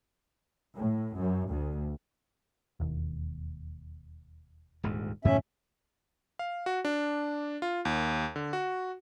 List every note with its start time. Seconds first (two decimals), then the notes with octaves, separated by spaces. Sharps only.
0.76 A2
1.17 F#2
1.48 D2
2.80 E1 D#2
4.83 D#1 D2 G#2
5.25 F2 G#2 B2 D#3 A3 C#4 E5
6.39 F5
6.66 F#4
6.85 D4
7.62 F4
7.85 D#2
8.36 D3
8.53 F#4